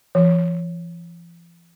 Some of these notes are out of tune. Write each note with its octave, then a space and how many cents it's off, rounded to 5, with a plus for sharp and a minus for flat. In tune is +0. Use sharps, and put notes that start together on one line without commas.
F3 -45